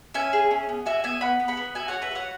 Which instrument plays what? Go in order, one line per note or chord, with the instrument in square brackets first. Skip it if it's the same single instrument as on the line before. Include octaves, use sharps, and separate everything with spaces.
[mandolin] C#4 E5 G#5
G#4
C#4
B3
F#4 E5 G#5
B3 E5 G#5
B3 F#5 B5
B3
F#5 B5
B3
F#4 E5 G#5
F#4 C#5 F#5
B4 E5
F#4 C#5 F#5